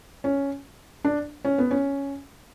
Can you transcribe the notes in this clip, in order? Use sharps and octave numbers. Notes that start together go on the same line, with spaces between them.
C#4
D4
C#4
B3
C#4